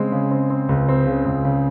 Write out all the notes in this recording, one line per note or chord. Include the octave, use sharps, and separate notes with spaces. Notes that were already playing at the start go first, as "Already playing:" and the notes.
Already playing: C#3 G#3 C4
C#3
C4
C4
C#2
C4
C#3
C#2
C#3